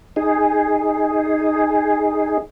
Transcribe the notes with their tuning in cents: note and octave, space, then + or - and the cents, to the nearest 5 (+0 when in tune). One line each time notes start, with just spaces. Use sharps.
D#4 +0 G#4 +0